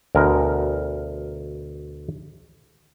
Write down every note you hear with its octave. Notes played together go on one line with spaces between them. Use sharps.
D2 B2 A#4